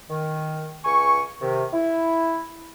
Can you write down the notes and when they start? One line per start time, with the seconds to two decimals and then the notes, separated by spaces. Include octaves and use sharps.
0.10 D#3
0.85 C#2 G#5 C#6
1.41 C3 D#3
1.73 E4